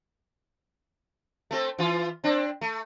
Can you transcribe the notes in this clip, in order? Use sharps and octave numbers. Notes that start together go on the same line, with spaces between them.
A3 C4 A4
E3 F4
C4 D4
A3